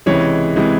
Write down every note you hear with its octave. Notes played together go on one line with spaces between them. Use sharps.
C#2 C3 E3 G#3 C#5
C3 E3 G#3